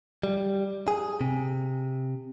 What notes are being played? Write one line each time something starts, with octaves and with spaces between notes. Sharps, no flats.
G3
G#4
C3